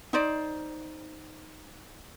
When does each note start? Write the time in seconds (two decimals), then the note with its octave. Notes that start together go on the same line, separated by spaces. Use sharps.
0.13 D#4 C5 D5